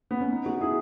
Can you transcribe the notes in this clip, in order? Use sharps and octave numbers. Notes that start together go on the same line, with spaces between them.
B3
C#4
B3 D#4
D#4 F#4
E4 G#4